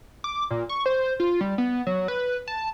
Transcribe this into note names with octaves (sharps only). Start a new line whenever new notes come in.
D6
A#2
C#6
C5
F4
G3
B3
F#3
B4
A5